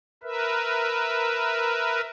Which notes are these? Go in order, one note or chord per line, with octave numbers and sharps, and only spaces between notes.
A#4 B4 E5